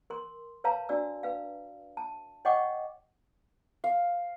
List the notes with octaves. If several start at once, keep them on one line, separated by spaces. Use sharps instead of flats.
A#4 C6
B4 C#5 F5 A5 A#5
D4 F#4 D5 E6
B4 F5
A5
C#5 D#5 F#5 G5 C#6 D6
F5